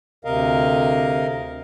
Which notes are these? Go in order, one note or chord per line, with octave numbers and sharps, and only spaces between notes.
D2 C3 A#4 D#5 F5